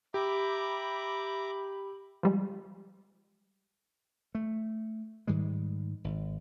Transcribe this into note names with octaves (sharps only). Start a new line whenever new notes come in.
G4 E5 A#5 B5 D6
F3 G3 G#3
A3
G#2 D#3 G3 G#3
G#1